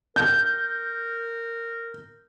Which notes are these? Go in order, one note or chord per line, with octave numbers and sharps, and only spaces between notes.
A#4 G6